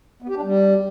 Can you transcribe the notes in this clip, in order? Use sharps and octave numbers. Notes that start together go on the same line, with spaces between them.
B3
G4
D4
G3